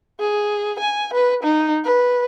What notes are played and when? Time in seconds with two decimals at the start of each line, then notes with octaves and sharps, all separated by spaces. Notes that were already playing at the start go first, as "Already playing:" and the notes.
0.20 G#4
0.79 G#5
1.13 B4
1.43 D#4
1.84 B4